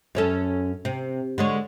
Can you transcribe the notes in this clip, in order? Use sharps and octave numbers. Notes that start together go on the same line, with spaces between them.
F#2 C#4 A4
C3
D3 G#3 C#5